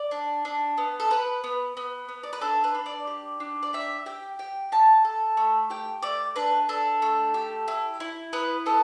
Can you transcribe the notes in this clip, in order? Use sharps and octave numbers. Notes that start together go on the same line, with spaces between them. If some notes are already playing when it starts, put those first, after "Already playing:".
Already playing: D5
D4
D4
B3
A4
B3 B4
B3
B3
B3
D5
B4
D4 A4
B4
D4
D5
G4
D4
D5
G4 E5
G4 G5
G4 G5
G4 A5
A4
A3
G4 G5
A3 D5
D4 B4
D4 A4
A3
G4
E4
E4
B3 B4
B3 A4